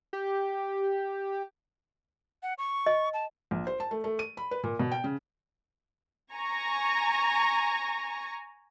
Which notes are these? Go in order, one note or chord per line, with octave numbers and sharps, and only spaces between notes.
G4
F#5
C#6
D#5
A5
A#1
C5
A5
A3
A3
D#7
B5
B4
A#2
B2
G5
C#3
G#5 A#5 C#6